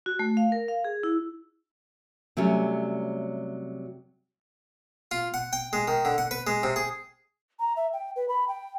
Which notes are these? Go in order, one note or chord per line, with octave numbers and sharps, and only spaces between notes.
F#4
A3
F5
A#4
F5
G#4
E4
C3 F#3 G3 A3 C#4
F4
F#5
G5
G#3
D#3
D3
F#5
B4
G#3
C3
G#4
A#5
E5
G5
B4
B5
G5